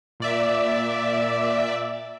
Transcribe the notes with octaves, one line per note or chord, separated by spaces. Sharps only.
A#2 D5 E5